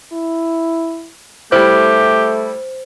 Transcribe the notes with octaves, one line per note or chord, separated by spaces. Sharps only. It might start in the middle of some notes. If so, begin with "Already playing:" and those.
E4
G3 A3 E4 G4 C5